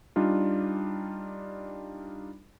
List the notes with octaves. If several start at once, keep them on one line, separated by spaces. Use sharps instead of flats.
G3 D4 D#4 F4